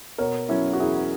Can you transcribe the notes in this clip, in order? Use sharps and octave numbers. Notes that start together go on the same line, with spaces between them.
B2 A#4 C#5
F#3 C#4 E4
F#4
E2 E4 G#4